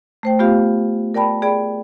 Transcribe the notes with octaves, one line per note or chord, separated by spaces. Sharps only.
A3 C5 G5
A3 B3 F4 G4 F5
A#4 D5 G5 A5 B5
G#4 D5 G5 B5